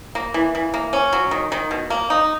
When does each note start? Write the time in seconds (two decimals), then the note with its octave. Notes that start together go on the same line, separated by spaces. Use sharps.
0.15 A#3
0.34 E3
0.55 E3
0.74 A#3
0.93 C#4
1.13 F#3
1.31 D#3
1.52 D#3
1.71 B2
1.90 A#3
2.10 D#4